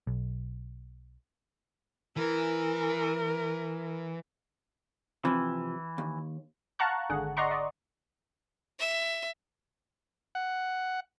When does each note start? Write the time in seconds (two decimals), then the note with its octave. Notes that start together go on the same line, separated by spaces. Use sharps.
0.07 B1
2.16 E3 A#4
5.25 C3 E3 F3
5.98 D#2
6.79 F5 F#5 A5 A#5 C#6 F#6
7.09 G#1 D3 G#4 F#5
7.37 D5 D#5 F#5 A#5 C6 C#6
7.51 D5 D#5
8.79 E5
10.35 F#5